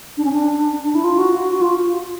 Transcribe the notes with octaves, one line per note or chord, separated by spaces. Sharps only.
D4
C#4
D4
D4
E4
F4
F#4
F#4
F4